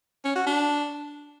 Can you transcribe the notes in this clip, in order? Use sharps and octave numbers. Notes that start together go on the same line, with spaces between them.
C#4
F#4
D4